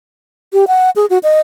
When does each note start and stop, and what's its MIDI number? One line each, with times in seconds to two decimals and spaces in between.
0.53 0.65 67
0.68 0.90 78
0.96 1.06 68
1.10 1.18 66
1.23 1.40 75